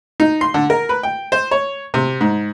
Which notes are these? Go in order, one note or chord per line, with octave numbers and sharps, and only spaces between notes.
D#4
C6
D3
A#4
B4
G5
C5
C#5
C3
G#2